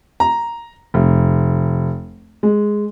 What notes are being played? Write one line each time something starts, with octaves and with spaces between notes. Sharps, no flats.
A#5
F1
G#3